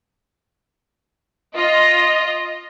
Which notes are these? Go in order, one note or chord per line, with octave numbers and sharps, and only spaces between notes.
F4 D#5